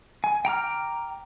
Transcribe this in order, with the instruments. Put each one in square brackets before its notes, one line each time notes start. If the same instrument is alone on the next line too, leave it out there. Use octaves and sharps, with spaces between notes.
[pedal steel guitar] G#5
G5 A#5 D6 F6